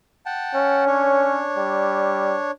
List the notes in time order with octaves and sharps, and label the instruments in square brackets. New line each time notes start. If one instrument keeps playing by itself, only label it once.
[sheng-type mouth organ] F#5 G5 A5
[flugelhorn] C#4
[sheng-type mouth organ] D4 C#5
[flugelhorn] G3